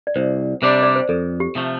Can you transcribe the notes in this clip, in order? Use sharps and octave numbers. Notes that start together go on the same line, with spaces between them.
D5
C2 C5
C3 G3 D4 C5
D5
C5
F2 A4
G4
C3 F3 A3